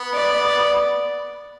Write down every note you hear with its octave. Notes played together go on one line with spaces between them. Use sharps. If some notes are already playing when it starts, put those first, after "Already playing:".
Already playing: B3
D5